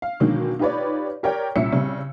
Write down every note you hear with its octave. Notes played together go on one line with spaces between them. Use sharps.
F5
B2 D3 D#3 F#3 G#3 A#3
D#4 F4 G4 B4 C#5 D5
G4 A#4 C#5 D5 G5
C2 A#2 C#4 E5 E6 C#7
C#3 G3 C4